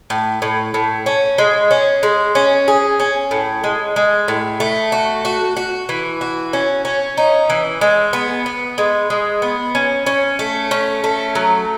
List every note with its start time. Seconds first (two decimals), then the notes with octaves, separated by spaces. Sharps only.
0.10 A2
0.42 A2
0.74 A2
1.06 C#4
1.38 G#3
1.71 C#4
2.03 G#3
2.35 C#4
2.68 G#4
3.00 C#4
3.31 A2
3.64 G#3
3.96 G#3
4.28 A2
4.60 A3
4.92 F#4
5.25 F#4
5.57 F#4
5.89 E3
6.21 F#4
6.53 C#4
6.85 C#4
7.17 D#4
7.50 E3
7.81 G#3
8.13 B3
8.46 B3
8.78 G#3
9.10 G#3
9.42 B3
9.75 C#4
10.06 C#4
10.39 A3
10.71 C#4
11.04 A3
11.35 F#3